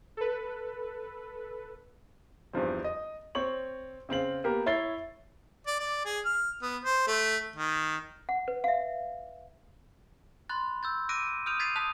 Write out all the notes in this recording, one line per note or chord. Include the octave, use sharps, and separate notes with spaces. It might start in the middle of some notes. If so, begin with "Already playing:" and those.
A4 B4
E2 G2 F3 C4
D#5
C4 C#5 C#6 F#7
C#3 C4 F5 F#7
A#3 B3 G4 A#4
E4 C#5 A6 C7 G7
D5
D5
G#4
F6
B3
C5
A3
D#3
F#5
B4
E5 F5
B5 C6 F#6 A6
E6 G6 A6
D6 E6 F#6 A#6 D7 D#7
D#6 F6 G6 D7 D#7 F7
G#6 A6 B6 C7 D#7 F7
A5 D#6 F#6 B6 F7